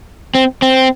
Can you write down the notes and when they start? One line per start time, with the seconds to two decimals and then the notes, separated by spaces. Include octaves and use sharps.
0.35 C4
0.62 C4